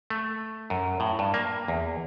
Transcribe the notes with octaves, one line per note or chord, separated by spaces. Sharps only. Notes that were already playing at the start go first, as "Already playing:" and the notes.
A3
F#2
A2
G2
A#3
E2